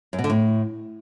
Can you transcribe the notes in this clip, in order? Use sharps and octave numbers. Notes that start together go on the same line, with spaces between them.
F#2
B2
D3
A2